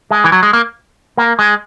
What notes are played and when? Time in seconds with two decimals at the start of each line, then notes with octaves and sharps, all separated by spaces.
0.11 G#3
0.24 E3
0.32 F#3
0.43 G#3
0.53 A#3
1.17 A#3
1.39 G#3